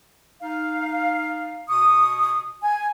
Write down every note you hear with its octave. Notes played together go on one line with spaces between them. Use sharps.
D#4 F5
B2 C#6 D#6
G#5